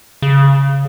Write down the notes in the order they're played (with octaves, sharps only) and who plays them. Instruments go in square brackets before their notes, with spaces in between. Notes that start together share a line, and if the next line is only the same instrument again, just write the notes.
[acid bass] C#3